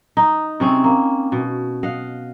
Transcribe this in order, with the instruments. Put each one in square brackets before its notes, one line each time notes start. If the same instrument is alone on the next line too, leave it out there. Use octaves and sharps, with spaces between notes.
[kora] D#4
C3 C4 C#4 G#4
A#3
B2
D#5 F5 F#5